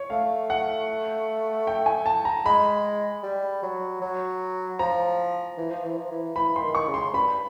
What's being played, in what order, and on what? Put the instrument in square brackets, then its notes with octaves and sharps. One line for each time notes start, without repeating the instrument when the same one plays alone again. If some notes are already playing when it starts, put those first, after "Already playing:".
Already playing: [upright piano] C#5
[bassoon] A3 [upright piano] F5
[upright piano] F#5
G5
G#5
A5
A#5
[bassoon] G#3 [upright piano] B5
[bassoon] G3
F#3
F#3
[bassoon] F3 [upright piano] A#5
[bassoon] E3
F3
E3
F3
E3
[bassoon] E3 [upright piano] B5
[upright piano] C6
[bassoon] D#3
[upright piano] C#6
[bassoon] C#3
[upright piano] C6
[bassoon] G2 [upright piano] B5